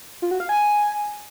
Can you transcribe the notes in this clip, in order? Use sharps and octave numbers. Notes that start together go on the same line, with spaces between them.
F4
F#4
F5
G#5